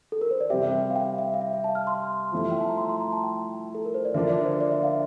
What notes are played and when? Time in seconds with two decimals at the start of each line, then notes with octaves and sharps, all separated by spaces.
0.12 A4
0.21 A#4
0.31 C5
0.40 D5
0.50 C3 G3 C4 G4 E5
0.90 F5
0.96 G5
1.18 E5
1.34 F5
1.41 E5
1.53 F5
1.64 A5
1.75 F6
1.87 C6
2.32 F3 A3 E4
2.51 G5
2.60 A5
2.69 A#5
2.78 C6
2.89 C6
3.00 A#5
3.12 A5
3.23 G5
3.75 A4
3.85 A#4
3.94 C5
4.05 D5
4.14 D3 F3 A#3 D4 F4 E5
4.30 D5
4.45 C5
4.60 D5
4.72 E5
4.83 F5